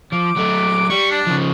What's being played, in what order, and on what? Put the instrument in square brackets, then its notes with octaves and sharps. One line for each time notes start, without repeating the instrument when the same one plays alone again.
[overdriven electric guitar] F3 [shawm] D6
[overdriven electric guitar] F#3 A3
[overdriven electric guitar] G3 [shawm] C#6
[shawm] D4
[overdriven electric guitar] C#3 F3